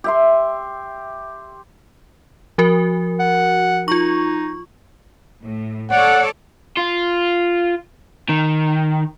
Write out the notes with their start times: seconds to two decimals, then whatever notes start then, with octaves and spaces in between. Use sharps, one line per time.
0.04 G4 E5 C6
2.58 F3 F#4 A#4
3.19 F#5
3.88 D#4 F4 C#6
5.42 A2
5.91 A4 C#5 D5 F#5
6.77 F4
8.29 D#3